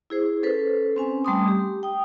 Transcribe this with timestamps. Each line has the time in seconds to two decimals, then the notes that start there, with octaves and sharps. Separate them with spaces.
0.10 E4 G#4 C5
0.43 C#4 A4 B4 C5
0.96 C4 C#4 G#5
1.25 G3 A3 B5 C6 D6 D#6
1.48 G4
1.83 G5 D#6